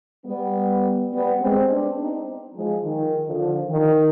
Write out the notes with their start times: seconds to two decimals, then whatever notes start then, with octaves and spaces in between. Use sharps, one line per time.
0.26 G3 B3
1.12 G3 B3
1.40 G#3 C4
1.69 B3 D4
1.97 C4 D#4
2.55 F3 G#3
2.83 D#3
3.26 D3 F3
3.70 D#3